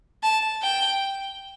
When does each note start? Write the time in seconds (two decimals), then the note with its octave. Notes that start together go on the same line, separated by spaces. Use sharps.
0.23 A5
0.62 G5